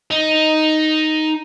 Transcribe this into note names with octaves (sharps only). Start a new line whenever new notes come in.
D#4